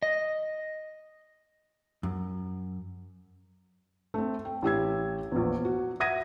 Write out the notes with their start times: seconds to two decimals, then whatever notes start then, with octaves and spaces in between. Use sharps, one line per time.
0.03 D#5
2.03 F#2
4.14 A3 C4
4.45 G5
4.62 A1 G4 E6 G#6
5.32 A#1 E2
5.65 F#4
6.00 E5 F#5 D#6 G#6 A#6 D#7